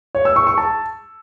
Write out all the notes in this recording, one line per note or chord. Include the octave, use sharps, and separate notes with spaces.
C#5
E6
C#6
C#6
A5